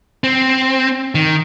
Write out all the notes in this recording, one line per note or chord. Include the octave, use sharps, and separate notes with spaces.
C4
D#3